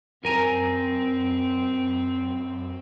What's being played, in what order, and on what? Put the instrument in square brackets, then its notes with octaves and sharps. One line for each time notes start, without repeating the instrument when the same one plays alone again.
[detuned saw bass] F#2 [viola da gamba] C4 [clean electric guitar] A#4 G#5 A#5